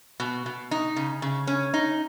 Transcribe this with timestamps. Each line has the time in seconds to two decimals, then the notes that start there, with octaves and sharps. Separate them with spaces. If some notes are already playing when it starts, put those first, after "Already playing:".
0.20 B2
0.46 B2
0.71 D#4
0.96 C#3
1.22 C#3
1.47 C#4
1.74 D#4